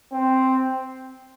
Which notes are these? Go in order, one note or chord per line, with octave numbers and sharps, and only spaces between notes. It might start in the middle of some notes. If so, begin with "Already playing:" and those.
C4